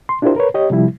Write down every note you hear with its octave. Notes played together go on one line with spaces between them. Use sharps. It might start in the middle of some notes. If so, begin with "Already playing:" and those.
C6
D4 E4 F4 G4 A#4 C5
A#4 B4 C#5
G4 C#5 D#5
C3 F3 G3 E4